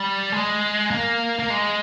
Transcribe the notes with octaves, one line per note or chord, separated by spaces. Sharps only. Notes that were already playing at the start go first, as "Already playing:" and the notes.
Already playing: G3
G#3
A#3
A#3
G#3